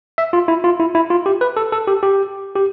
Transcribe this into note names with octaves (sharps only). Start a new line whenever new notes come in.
E5
F4
E4
F4
E4
E4
F4
G4
B4
A4
A4
G4
G4
G4